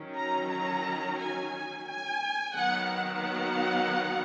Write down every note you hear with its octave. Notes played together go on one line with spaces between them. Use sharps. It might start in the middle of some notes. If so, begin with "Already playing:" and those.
Already playing: D#3 F#3 C#4
A#5
A#5
G#5
G#5
D#3 F#3 B3 F#5
F#5